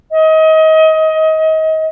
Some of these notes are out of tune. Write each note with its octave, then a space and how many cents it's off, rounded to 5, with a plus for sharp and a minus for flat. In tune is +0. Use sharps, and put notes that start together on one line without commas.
D#5 +30